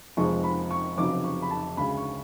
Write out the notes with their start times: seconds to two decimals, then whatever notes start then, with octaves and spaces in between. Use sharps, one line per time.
0.17 F1 F2 F3 G#3 C#6
0.44 B5
0.71 C#6
0.97 F1 F2 C#3 F#3 D6
1.24 C#6
1.42 B5
1.51 A5
1.77 D2 C#3 G#3 B5
1.97 C#6